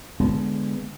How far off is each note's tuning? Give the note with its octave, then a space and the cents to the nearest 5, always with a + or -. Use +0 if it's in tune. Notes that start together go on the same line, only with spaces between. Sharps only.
D3 +0 G#3 +0 B3 +5